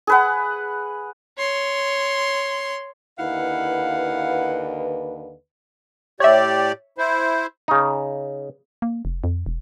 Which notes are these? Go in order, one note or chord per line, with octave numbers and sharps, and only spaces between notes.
G#4 B4 F#5
C#5 C6
D#2 D3 E4 B4 F5 F#5
A2 G4 C#5 D5 E5
E4 C5
C#3 D#4
A#3
F1
F2
E1